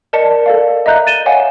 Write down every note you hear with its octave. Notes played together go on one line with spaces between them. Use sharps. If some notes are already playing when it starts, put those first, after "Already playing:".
A#4 D5 D#5 A5 C#7
A4 D5 F5
D#5 E5 A#5 F#6 G6
A6 D#7 E7 G7
C#5 D#5 F5 F#5 G#5